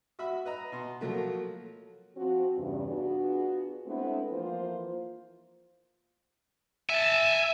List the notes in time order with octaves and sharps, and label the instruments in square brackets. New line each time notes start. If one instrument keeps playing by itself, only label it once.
[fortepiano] F#4 E5 B5
B4 D#5 A#5
B2 C6
F3 F#3 A3 A#3
[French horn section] F3 C4 F#4
E2 G2 C#3
B3 D4 F4 F#4 G#4
G#3 A3 B3 C4 D4 E4
E3 F3 A#3 F4 C5
[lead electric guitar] E5 [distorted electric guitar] G#5 A5